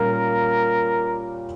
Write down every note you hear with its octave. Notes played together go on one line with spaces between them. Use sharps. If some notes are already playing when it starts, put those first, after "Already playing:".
Already playing: A#2 G3 A#3 C#4 F4 A#4